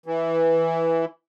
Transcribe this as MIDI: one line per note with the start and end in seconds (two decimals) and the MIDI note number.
0.06 1.05 52